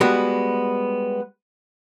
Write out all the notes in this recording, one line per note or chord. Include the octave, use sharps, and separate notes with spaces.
G3 G#3 B3 F#4